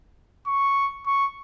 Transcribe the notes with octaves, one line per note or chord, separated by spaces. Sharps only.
C#6
C#6